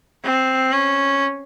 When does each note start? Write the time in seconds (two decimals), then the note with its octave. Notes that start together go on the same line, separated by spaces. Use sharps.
0.24 C4
0.72 C#4